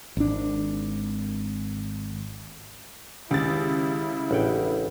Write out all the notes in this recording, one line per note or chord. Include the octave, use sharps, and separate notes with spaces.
G#1 D4
C#2 D#3 E4 G4 A6
A1 D4 G#4 F#5 G5